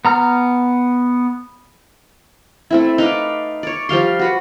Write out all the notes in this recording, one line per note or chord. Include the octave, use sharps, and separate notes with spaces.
B3 A#5 F6
A3 C4 E4
D#4 B4 F5 D6
C#5 D5
F3 G3 F5 C6
F#4 B4 F#5